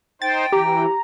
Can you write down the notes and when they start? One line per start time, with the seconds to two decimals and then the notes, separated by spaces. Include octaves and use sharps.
0.22 D#4 C5 G5 A6
0.52 E3 G4 A#5